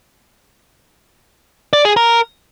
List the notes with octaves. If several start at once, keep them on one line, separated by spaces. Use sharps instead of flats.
D5
G#4
A#4